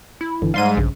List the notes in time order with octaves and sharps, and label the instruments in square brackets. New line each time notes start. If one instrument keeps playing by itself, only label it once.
[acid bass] E4
[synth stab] G1 D3 E3
[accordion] G#2 [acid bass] G3 [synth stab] F5 C6 D#7
[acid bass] A#1 [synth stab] G2 C#3